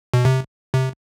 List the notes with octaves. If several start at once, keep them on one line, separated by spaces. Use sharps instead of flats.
B2
C3
C3